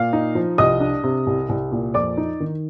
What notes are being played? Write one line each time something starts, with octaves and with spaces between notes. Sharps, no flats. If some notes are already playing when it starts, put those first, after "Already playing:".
Already playing: A#2 F5 F6
D#4
F3
C2 D#5 D#6
D4
C3
C2
C2
A#2
F2 D5 D6
D#4
D#3